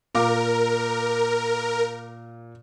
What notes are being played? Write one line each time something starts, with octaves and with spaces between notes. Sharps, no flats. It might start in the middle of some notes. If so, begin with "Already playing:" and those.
A#2 A#4 F5 D6